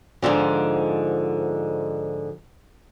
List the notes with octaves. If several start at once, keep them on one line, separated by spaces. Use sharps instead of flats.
G#2 B2 D3 F3